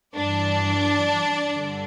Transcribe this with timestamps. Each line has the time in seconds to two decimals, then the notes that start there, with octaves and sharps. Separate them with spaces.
0.16 G2 E3 D4 D5
1.53 G2 D3